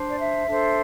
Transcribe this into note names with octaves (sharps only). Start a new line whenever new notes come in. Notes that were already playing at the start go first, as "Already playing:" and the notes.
Already playing: D4 C5
D5
E5
D4 A4 C5